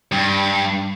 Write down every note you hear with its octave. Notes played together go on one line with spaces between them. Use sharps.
G2